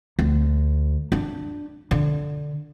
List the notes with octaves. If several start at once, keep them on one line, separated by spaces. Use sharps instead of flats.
D2
D4
D3